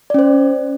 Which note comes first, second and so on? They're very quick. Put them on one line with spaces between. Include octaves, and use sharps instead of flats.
D5 C#4 C5